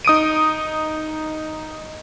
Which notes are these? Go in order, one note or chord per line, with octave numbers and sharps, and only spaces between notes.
D#4 D#6 D7 D#7